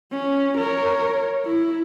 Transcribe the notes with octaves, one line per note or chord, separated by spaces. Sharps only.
C#4
A#4 C#5
E4